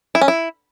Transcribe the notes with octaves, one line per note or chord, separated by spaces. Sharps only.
E4
C#4
E4